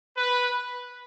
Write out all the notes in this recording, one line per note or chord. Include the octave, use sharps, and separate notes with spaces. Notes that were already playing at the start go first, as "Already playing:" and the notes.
B4